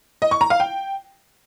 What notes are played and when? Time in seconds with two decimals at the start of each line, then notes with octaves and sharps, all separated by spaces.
0.22 D#5
0.31 C#6
0.41 A#5
0.50 F5
0.60 G5